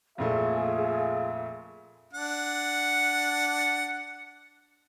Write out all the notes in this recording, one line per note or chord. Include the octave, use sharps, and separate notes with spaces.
F2 A#2 A3 F4 G#4 E5
D4 F#5